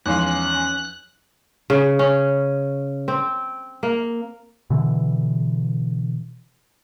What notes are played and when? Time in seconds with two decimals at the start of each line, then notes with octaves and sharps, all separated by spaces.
0.06 E2 F3 G#3 C#4 D#4 F5 F#6
1.70 C#3
1.99 C#4
3.08 C4
3.83 A#3
4.70 B2 D3 E3